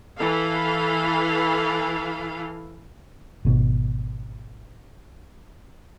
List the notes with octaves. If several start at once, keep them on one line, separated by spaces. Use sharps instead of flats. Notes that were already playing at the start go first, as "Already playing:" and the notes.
E3 A4 F5
G#1 B2